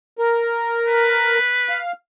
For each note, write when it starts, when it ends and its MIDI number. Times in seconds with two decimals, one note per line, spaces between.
0.18 1.38 70
0.88 1.80 71
1.69 1.92 77